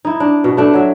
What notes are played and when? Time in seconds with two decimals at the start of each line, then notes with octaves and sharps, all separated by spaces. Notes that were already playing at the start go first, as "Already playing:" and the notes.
0.05 D#4 E4
0.20 D4
0.44 B2
0.57 A3 D4 A4
0.73 F#3 E5